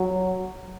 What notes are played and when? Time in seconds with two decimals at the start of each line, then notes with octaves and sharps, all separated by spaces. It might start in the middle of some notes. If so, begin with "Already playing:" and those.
Already playing: F#3